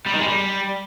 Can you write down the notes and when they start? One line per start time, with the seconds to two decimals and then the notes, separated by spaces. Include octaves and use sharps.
0.07 G3
0.14 D#3
0.21 G#3
0.28 G3